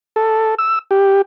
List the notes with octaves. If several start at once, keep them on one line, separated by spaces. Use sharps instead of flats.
A4
E6
G4